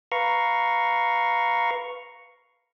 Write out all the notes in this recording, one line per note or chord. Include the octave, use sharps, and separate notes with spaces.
B4 F5 A#5 C#6